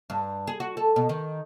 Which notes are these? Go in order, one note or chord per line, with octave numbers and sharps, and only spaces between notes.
G2
G#4
F#4
A4
B2
D#3